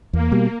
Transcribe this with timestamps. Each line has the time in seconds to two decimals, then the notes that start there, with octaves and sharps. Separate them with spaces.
0.13 E2 A#3
0.32 B2 G3